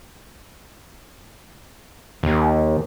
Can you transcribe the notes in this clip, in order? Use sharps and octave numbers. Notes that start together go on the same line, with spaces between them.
D#2